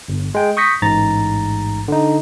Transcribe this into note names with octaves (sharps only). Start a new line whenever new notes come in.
G1
G#3 G5
C#6 D#6 G6 A#6 B6 C#7
A1 G#2 A#5 A6
D3 D#4